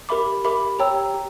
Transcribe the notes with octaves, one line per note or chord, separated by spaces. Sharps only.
G4 A#4 E5 B5 D6
G4 A#4 E5 B5 D6
G4 C#5 G5 A#5 E6
G4